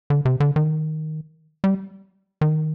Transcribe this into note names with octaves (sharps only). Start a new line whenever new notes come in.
D3
C3
D3
D#3
G3
D#3